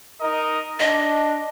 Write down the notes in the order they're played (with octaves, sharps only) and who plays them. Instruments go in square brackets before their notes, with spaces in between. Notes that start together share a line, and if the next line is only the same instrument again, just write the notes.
[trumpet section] D#4 A#4 D#5
[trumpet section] D4 [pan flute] D#5